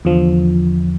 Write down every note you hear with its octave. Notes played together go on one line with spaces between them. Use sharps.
E2 D3 F3